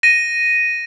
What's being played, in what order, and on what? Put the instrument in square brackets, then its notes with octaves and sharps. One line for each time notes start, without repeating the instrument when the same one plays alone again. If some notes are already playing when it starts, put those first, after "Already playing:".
[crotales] A#6 D#7